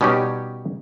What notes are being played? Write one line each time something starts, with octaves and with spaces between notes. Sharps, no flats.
B2 G3 C#4 D#4 G4